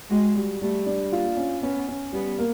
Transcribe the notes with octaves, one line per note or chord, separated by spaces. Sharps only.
G#3 F#4
G3
G3 A3
D4
A#3 F4
C#4
B3 C#4
C#4
G3 B3
A#3